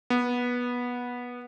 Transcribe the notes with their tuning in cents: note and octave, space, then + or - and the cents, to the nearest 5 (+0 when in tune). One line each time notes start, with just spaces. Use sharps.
B3 -15